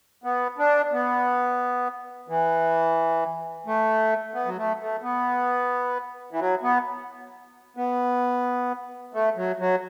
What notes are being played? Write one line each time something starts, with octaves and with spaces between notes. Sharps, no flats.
B3
D4
B3
E3
A3
B3
F#3
A3
A3
B3
E3
F#3
B3
B3
A3
F#3
F#3